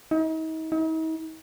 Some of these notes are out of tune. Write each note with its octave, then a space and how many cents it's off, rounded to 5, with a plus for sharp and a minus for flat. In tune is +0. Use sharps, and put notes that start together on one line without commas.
D#4 +40
D#4 +45